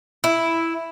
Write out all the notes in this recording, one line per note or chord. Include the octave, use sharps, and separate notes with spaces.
E4